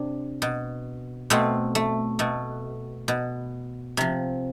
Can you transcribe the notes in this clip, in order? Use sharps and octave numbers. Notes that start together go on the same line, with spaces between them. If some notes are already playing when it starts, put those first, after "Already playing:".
Already playing: C3 D4
B2
B2 A3 C4
A3
B2 A3
B2
C3 F3